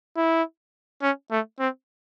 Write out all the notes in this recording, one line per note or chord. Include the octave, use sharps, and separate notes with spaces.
E4
C#4
A3
C4